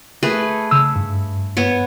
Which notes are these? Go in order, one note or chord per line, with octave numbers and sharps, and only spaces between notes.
A3 G#4 B4
C#3 E6
G2
B3 C#5